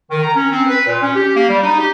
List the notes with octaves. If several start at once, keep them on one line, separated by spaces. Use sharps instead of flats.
D#3
A#5
C#4
C4
B4
A#2
C#4
G4
A#3
G3
D#4
G4